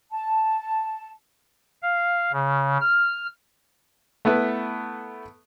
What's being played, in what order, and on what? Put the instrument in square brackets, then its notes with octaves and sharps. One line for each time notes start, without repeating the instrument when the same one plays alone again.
[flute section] A5
[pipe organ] F5
C#3
F6
[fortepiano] A3 B3 E4 B4